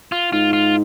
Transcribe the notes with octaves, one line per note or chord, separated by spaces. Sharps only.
F4
G#2 F4
F4